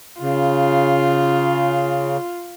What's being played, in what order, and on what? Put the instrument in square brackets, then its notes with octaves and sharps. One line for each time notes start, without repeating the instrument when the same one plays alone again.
[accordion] C#3 [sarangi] F4